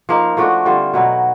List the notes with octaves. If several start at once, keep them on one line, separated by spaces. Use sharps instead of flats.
F3 A#3 D#4
F3 A3 D4 F#4
D3 G3 C4 F4
B2 F#3 B3 D#4